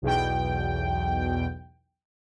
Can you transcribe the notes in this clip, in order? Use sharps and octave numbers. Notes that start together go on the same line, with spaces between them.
B1 E2 B2 G5